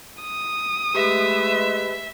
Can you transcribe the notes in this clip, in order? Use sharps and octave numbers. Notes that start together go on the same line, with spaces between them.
D#6
G#3 A3 G4 B4 E5